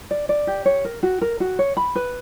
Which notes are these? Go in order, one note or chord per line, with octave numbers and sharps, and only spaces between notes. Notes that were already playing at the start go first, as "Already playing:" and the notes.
D5
D5
G4
C#5
A#4
F#4
A#4
F#4
C#5
B5
B4